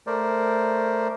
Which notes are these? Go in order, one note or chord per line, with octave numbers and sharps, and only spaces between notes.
A3 A#4 C5 D5